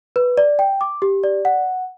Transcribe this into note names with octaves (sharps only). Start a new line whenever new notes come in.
B4
D5
G5
D6
G4
D5
F#5